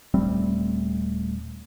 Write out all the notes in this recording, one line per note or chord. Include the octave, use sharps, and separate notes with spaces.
D#1 G3 A3 C4